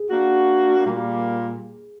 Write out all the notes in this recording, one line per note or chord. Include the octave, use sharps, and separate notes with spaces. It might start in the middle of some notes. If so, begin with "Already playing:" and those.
Already playing: G#4
A#3 D4 F#4
A#2 G3 A#3